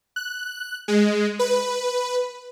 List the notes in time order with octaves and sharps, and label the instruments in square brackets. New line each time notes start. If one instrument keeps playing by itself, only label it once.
[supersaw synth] F#6
G#3
B4